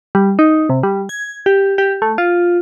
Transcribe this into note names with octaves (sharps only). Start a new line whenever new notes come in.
G3
D#4
C3
G3
G#6
G4
G4
A3
F4